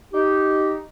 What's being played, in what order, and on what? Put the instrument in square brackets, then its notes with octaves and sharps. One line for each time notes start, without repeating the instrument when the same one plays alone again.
[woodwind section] D#4 G4